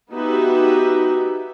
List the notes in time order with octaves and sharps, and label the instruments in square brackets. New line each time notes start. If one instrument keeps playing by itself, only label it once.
[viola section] B3 D#4 F#4 G4 B4 E5